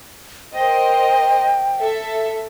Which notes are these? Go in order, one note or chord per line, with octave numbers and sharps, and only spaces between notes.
A#4 C5 D#5 G5
A4 E5